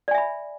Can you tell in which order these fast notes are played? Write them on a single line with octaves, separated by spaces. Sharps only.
D5 G#5 E5 B5